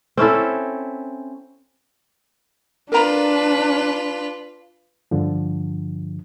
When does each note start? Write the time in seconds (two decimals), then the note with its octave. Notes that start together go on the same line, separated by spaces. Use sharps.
0.17 C4 C#4 E4 A4
2.92 D4 F4 A#4 B4 A#5
5.11 G2 D3 F3